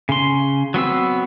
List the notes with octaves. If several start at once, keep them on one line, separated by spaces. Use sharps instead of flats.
C#3 C6
F#3 B3 C4 E6